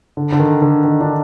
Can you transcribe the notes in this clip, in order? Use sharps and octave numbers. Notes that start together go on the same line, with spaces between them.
D3
D3
D#3
D3
D#3
D4